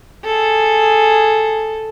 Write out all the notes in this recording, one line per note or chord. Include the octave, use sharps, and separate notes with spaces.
G#4 A4